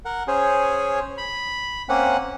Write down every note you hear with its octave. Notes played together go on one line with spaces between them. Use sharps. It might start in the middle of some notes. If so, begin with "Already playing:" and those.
A#4 F#5
C#4 G#4 C5 C#5
B5
A#3 C4 C#4 F#5